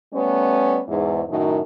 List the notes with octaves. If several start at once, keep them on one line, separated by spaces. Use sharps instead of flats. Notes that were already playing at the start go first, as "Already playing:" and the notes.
G3 A3 B3 C#4
E2 G#2
F#2 A2 D#3 F#3